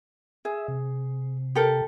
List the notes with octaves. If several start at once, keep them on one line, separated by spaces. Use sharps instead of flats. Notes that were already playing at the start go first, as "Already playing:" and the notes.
G#4 E5
C3
G4 A4 A#4